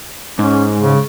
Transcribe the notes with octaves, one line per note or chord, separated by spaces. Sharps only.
G#2 C#4
C#3